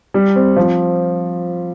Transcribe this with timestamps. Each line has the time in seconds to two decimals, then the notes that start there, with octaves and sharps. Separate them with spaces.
0.14 G3
0.36 C4
0.56 F3